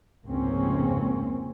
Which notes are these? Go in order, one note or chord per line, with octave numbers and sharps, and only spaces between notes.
F1 C#2 G#2 A#3 C4 C#4